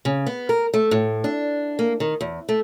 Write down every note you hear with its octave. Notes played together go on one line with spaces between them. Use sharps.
C#3
B3
A#4
A3
A2
D4
A#3
D#3
E2
A3